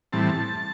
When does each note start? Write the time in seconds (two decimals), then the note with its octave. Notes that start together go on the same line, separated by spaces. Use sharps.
0.13 A2 E3 G3 C4 A5